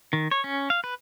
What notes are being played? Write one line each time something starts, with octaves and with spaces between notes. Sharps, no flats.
D#3
C#5
C#4
F5
B4